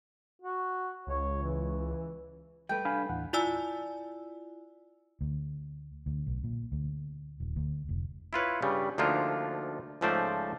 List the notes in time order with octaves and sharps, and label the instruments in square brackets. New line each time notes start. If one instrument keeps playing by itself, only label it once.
[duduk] F#4
[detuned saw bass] C#2 [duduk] C#5
[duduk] E3
[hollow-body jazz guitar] G3 A3 B4 [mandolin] G5
[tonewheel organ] D4 [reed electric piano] F5 G#5 B5
[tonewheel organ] D#2 A2 E3 [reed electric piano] F#5
[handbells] E4 F4 D5 G#5 E6
[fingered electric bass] D2
D2
B1
A#2
D2
D#1
D2
F1
[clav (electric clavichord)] E4 F4 B4 C#5
G2 C#3 G3
D2 F3 A#3 D4 D#4 F4
C#2 G#2 F3 A3 C5 D5